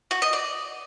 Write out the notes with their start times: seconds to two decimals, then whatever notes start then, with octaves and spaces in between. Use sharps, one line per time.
0.11 F#4
0.22 D#5
0.33 D5